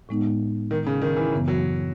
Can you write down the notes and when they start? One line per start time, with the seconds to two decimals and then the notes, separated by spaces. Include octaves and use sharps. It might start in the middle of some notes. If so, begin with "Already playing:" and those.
0.09 A2 G#3 B3 D#4
0.71 D#3
0.86 C#3
1.02 D#3
1.17 E3
1.32 F#2 C#3 E3 B3
1.48 F#3